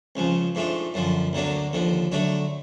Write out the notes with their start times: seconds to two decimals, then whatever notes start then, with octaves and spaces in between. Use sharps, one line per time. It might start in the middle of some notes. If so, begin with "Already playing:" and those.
0.16 C#2 C#3 F3
0.55 G#2 F3 A3 D4
0.94 F#2 D3 F3
1.33 D2 D3 F#3 A#3 D4
1.73 D#2 D3 F3
2.12 D3 F#3 A3 D4